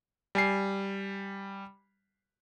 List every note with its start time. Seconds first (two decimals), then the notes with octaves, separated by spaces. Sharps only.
0.35 G3 G#5 C7